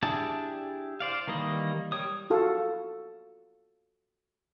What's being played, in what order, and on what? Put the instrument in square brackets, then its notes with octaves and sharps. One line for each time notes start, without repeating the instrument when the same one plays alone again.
[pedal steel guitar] D4 E4 G4 G#4 A5
C5 D5 F5
D#3 E3 G3 A#3 D#5
G3 C#5 D#6
[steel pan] F4 F#4 A4 F5